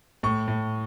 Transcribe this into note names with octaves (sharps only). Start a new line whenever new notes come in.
A2 C#6
A2